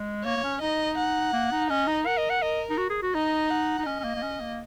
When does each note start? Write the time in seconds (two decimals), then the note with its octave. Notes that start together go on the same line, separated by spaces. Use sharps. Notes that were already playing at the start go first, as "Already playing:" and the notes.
Already playing: G#3
0.25 A#3 C#5
0.37 A#3
0.44 C#4
0.61 D#4 D#5
0.97 F#5
1.33 A#3
1.52 D#4
1.70 C#4 D#5
1.87 D#4
2.06 A#4 F#5
2.18 D#5
2.30 F#5
2.42 A#4 D#5
2.70 D#4
2.78 F#4
2.90 G#4
3.02 F#4
3.14 D#4 D#5
3.50 F#5
3.79 D#4
3.86 C#4 D#5
4.00 C#4
4.04 A#3
4.16 A#3
4.23 C#4
4.41 A#3